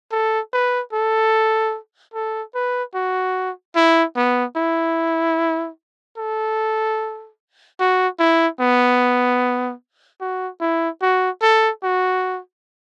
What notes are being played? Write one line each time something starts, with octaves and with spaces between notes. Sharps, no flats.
A4
B4
A4
A4
B4
F#4
E4
B3
E4
A4
F#4
E4
B3
F#4
E4
F#4
A4
F#4